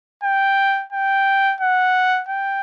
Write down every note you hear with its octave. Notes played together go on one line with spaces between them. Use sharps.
G5
G5
F#5
G5